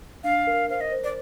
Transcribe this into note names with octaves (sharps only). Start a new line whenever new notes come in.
D4 F5
A#4
C5 F5
D#5
C5
D5